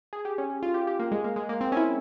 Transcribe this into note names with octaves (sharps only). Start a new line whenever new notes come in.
G#4
G4
C#4
C#4
F4
G4
G4
A#3
G#3
A#3
G#3
A#3
C4
C#4
E4